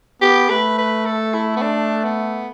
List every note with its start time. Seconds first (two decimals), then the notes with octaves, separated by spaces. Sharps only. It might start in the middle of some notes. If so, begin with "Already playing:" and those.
0.22 B3 G4
0.50 A3 B4
0.78 B4
1.06 A4
1.34 E4
1.56 B3
1.62 D4
2.04 B3